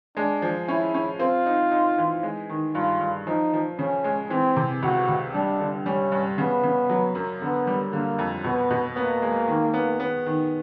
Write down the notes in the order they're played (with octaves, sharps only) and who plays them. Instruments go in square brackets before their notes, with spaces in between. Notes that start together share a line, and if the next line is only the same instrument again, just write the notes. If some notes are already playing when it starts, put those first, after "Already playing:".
[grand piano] G#3 [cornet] D4
[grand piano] F3
[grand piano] C#4 [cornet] E4
[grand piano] C#4
[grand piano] C4 [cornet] F4
[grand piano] D#4
D#4
E3
G#3
D#3
[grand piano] G2 [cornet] F4
[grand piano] G2
[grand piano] F3 [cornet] D#4
[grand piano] F3
[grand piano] C#3 [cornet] C#4
[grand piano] G#3
[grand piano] E3 [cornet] C4
[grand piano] C3
[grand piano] C#2 [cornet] F#4
[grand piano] C#2
[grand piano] G3 [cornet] D4
[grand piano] D3
[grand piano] G3 [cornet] C#4
[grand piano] G2
[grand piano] C#3 [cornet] B3
[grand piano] C#3
F#3
F#2
[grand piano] D3 [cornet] B3
[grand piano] G3
[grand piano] D3 [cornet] A#3
[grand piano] F2
[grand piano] B2 [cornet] B3
[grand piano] B2
[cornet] A#3 [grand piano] B3
[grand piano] G#3
D#3
B3
B3
D#3